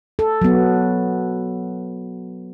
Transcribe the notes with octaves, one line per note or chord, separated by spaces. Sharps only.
A4
F#3 B3